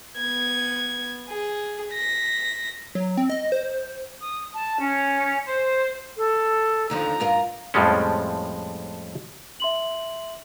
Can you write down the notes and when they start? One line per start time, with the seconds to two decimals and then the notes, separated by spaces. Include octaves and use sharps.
0.17 B3 G#6
1.28 G#4
1.93 A#6 B6
2.95 F#3
3.17 C4
3.30 D#5
3.52 C5
4.21 D#6
4.54 A5
4.80 C#4
5.45 C5
6.17 A4
6.90 D#2 D3 F3 A#5
7.20 G2 F4 A#4
7.74 F2 A2 F3 G3 G#3 C#4
9.60 E5 C6 F#7